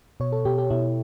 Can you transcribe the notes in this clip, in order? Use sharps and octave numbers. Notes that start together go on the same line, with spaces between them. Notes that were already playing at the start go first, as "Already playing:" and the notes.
B2 C#5
A4
B2 G4
G4
B2 E4